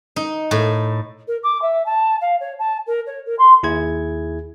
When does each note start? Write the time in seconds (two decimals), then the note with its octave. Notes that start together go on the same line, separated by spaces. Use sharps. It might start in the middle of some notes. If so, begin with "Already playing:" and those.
0.16 D#4
0.51 A2
1.27 A#4
1.42 D6
1.61 E5
1.86 A5
2.21 F5
2.40 C#5
2.59 A5
2.86 A#4
3.06 C#5
3.25 A#4
3.38 C6
3.63 D#2 E4 G#4 G#6